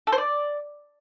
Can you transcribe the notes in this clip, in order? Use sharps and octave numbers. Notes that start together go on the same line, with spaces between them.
A4
C5
D5